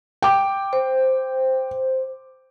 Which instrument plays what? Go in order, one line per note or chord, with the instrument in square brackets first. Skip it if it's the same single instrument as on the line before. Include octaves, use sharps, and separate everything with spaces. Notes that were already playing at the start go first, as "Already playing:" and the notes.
[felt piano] G5 D6
[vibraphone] C5